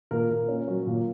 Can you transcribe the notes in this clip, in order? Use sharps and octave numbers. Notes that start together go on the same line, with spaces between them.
A#2 A#4
A#2
C#4
F#3
A#2